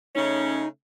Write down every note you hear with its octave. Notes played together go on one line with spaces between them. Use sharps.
C#3 A3 C#4 D#4